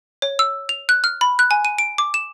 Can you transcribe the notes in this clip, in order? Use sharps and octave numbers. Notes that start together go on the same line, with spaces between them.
C#5
E6
F7
F#6
F6
B5
F#6
G#5
D#7
D7
D6
E7